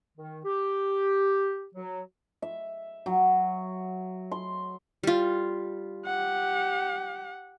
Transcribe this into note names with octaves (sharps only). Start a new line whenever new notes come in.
D#3
G4
F#3
E5
F#3
C6
G3 F4
G4 F#5